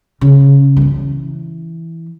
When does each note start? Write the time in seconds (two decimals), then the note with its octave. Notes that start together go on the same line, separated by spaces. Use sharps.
0.21 C#3
0.77 F3
0.81 E3